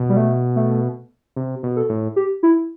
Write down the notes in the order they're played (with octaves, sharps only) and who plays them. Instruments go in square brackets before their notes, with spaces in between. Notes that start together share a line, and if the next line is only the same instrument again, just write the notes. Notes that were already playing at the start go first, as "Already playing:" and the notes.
Already playing: [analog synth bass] B2
[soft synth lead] G3
A3
A3
[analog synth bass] C3
B2
[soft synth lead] A4
[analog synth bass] A2
[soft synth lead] G4
E4